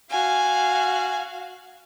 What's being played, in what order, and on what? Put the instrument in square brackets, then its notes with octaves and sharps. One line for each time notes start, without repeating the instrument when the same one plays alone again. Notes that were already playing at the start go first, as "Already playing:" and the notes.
[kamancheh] F#4 F5 [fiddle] G#5